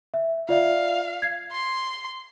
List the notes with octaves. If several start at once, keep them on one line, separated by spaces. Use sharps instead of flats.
E5
F4 D5 E5 F5
G#6 C7
C6